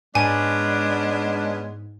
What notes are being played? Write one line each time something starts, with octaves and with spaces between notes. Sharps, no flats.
G#2 G#3 B3 C#4 D4 G#5